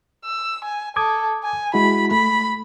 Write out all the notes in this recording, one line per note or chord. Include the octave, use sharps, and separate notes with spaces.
E6
G#5
A4 D6 D#6 G#6
G#5
G#3 E4 F#4 B5
A3 B5